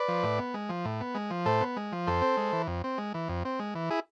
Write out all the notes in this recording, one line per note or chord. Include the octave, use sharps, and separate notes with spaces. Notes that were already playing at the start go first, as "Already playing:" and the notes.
Already playing: B4 D5
F3
A2
B3
G#3
F3
A2
B3
G#3
F3
A2 A4 C5
B3
G#3
F3
F2 A4 C5
C4
G#3
E3
F2
C4
G#3
E3
F2
C4
G#3
E3
E4 G#4